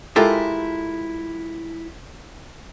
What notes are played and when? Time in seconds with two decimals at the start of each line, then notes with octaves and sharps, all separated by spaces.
0.16 G#3 E4 F4 G4 A4 A#4